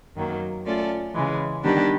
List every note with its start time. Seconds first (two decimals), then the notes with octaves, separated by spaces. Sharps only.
0.15 F#2 D#3 F#3 A#3
0.65 A3 C#4 F4 A4 D5
1.14 C#3 E3 G#3
1.63 D#3 G3 B3 D4 G4